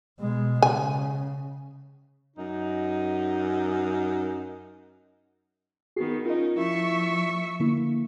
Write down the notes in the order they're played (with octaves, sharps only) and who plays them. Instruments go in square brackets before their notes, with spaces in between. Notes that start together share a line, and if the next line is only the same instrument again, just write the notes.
[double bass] B2 G#3
[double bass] C#3 [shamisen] G#5
[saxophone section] F#2 D#4
[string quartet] D#3 B3 [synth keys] F#4 G#4 C7
[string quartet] C#4 D#4 A#4 [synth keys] F4 D#5
[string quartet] F3 E5 C#6 [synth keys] E4
[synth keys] D3 A#3 E4